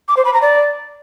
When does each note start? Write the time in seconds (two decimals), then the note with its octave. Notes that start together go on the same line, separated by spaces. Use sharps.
0.08 D6
0.17 C5
0.25 B5
0.33 A#5
0.42 D5